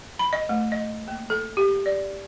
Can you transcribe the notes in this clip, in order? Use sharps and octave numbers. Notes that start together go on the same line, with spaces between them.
B5
D#5
A3
D#5
A#3
A4
G4
D5